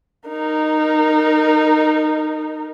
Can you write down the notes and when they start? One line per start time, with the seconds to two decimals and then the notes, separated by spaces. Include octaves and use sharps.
0.29 D#4 A#4